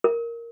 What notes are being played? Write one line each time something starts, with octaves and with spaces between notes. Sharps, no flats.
A#4